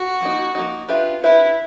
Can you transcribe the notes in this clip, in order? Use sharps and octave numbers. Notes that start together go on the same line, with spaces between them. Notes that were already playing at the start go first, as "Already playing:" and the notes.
Already playing: F#4
F3 A#3 D#4
F3 A#3 D#4
D4 F4 G4 B4 E5
D4 E4 G4 B4 E5